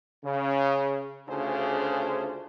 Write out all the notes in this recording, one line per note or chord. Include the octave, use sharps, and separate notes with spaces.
C#3
D2 C#3 D4 F4 G#4 C5